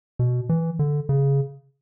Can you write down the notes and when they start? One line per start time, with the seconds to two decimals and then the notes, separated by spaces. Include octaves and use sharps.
0.19 B2
0.49 E3
0.79 D3
1.09 C#3